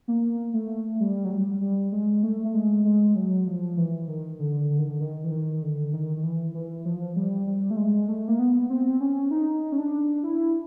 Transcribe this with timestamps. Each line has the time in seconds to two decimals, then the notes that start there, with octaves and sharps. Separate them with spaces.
0.08 A#3
0.54 A3
1.00 G3
1.25 F#3
1.31 G3
1.61 G3
1.92 G#3
2.23 A3
2.44 A3
2.54 G#3
2.85 G#3
3.15 F#3
3.46 F3
3.77 E3
4.08 D#3
4.39 D3
4.70 D3
4.79 D#3
4.89 D3
5.00 D#3
5.24 E3
5.31 D#3
5.62 D3
5.93 D#3
6.16 D#3
6.23 E3
6.54 E3
6.85 F3
7.16 G3
7.47 G3
7.71 A3
7.77 G#3
8.08 A3
8.28 A#3
8.39 B3
8.70 C4
9.01 C#4
9.31 D#4
9.72 C#4
9.78 D4
10.23 E4